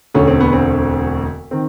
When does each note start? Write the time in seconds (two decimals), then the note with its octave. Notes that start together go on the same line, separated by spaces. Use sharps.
0.15 E1 D2 D3 C#4
0.28 C4
0.40 B3
0.53 C4
1.51 D#3 C4